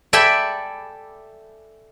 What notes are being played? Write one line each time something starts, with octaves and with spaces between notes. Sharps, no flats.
A4 D5 E5 G5 G#5 B5